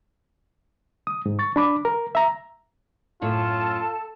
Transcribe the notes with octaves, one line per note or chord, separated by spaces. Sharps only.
D#6
G#2
C#6 A6
D4 B5 D6
A#4
E5 A#5
F#2 A2 F4 A4 C#5 A5